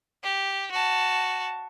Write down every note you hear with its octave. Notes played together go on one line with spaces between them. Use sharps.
G4
F#4 A5